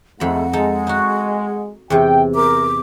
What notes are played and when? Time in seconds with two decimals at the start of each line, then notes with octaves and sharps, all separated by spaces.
0.20 F2 G#2 A3 F#5 B5
0.53 G#3 D#4 A4
0.87 D#4 F#4
1.90 E2 C3 G5
2.35 A#4 D6